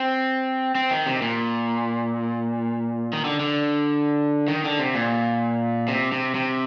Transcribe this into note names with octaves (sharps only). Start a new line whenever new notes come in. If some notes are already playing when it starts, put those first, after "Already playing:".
Already playing: C4
C4
D#3
C3
A#2
D#3
D3
D3
D#3
D3
C3
A#2
C3
C3
C3